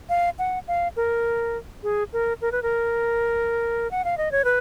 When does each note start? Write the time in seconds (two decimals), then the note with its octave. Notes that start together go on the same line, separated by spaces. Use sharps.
0.09 F5
0.39 F#5
0.68 F5
0.96 A#4
1.83 G#4
2.13 A#4
2.41 A#4
2.52 B4
2.63 A#4
3.91 F#5
4.04 F5
4.18 D#5
4.32 C#5
4.45 B4